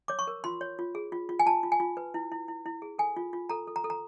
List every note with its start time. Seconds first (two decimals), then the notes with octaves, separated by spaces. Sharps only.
0.08 C#5 D6
0.19 C#6
0.27 A#4
0.44 F4 C6
0.61 C#5
0.79 F4
0.95 G#4
1.12 F4
1.29 F4
1.39 G#5
1.46 F4 A5
1.63 F4
1.72 G#5
1.80 F4
1.97 B4
2.14 E4
2.32 E4
2.48 E4
2.66 E4
2.82 G#4
2.99 A4 G#5
3.17 F4
3.33 F4
3.49 A4 A#5
3.67 A4
3.76 A#5
3.84 A4
3.90 A#5